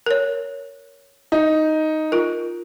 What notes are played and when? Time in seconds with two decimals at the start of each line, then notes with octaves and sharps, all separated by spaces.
0.06 A#4 C#5
1.32 D#4
2.12 F4 A#4